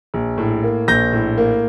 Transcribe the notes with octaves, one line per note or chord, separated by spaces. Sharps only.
A#1
A2
A#3
A#1 G6 A#6
A2
A#3